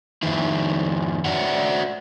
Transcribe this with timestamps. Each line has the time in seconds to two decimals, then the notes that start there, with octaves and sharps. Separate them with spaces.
0.23 F2 D#3 E4
1.25 F#4 C#5 D5 E5 F#5